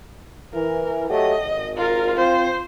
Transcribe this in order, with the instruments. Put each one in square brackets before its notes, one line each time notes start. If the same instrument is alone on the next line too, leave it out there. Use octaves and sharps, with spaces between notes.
[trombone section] E3 [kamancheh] A#4
[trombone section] F#3 A3 G4 [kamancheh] D#5
[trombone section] G#1
[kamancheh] F4 A#4
[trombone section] C4 F4 [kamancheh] C5